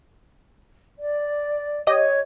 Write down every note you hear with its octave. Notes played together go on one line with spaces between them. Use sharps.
D5
G4 C#5 D#5 D#7